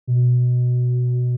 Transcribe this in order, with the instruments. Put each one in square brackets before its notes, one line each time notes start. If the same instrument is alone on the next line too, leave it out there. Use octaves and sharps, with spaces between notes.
[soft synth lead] B2